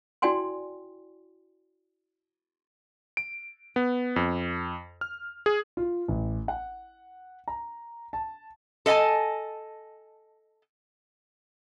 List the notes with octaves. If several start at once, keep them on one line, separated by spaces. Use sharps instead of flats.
E4 F#4 D5 G5 G#5 C6
D7
B3
F2
F6
G#4
F4
A1
F#5
A#5
A5
A4 D#5 E5 G#5 A5